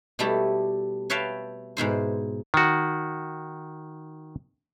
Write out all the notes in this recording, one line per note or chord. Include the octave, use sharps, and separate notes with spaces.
B2 G3 A3 E4 G4
B4 C#5 E5 F5 G5 A5
G#2 B2 E4 C5
D#3 F#4